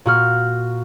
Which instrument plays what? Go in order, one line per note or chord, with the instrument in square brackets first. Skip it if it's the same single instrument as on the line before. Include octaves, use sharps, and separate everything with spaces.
[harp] A#2 F#4 F6